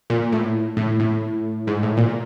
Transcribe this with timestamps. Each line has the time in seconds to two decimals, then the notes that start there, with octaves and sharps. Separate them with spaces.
0.10 A#2
0.32 A2
0.77 A2
1.00 A2
1.67 G#2
1.83 A2
1.97 A#2